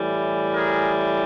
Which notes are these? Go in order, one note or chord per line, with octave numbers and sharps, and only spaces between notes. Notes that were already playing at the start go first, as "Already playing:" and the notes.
Already playing: A2 E3 G3
G#4 A#4